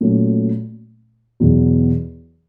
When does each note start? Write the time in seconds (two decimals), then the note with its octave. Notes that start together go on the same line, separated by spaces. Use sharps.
0.01 A#2 F#3 A3 C#4
1.40 E2 B2 F#3